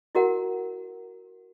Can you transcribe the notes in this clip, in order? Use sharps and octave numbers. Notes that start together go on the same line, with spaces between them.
E4 F#4 A#4 F#5